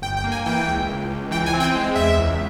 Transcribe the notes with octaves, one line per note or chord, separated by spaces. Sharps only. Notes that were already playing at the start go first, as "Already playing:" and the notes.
G1 G5
G5
A#3
G#5
E3 G5
C#2
C#2
C#2
E3 G5
G#5
C4
G5
G#3
E2 E5
C#2